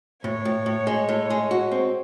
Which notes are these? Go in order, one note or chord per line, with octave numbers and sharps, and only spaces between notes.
A2 C#5
A2
A2
G#3
A2
G#3
F#4
C4